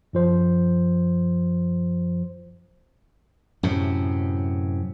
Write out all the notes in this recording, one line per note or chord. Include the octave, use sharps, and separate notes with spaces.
F#2 F3 C5
F#2 A2 C3